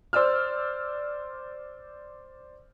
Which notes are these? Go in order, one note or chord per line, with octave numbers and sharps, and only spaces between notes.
C5 D5 E6 F6